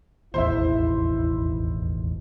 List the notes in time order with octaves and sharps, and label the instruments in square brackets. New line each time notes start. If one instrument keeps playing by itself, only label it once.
[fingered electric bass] E1 A1 D#2 [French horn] E4 [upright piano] C5 E5